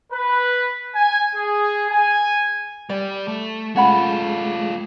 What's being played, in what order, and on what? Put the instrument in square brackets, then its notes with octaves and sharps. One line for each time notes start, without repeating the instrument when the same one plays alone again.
[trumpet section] B4
G#5
G#4
G#5
[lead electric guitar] G3 [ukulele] D5
[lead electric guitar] A3
[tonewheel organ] G#3 [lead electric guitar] A3 F4 [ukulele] C#4 F#5 B5